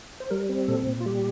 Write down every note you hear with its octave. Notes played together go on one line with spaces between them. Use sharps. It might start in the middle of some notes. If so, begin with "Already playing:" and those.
C5
G3 A#4
C4
A#2 A4
A#2
F4
G3 G4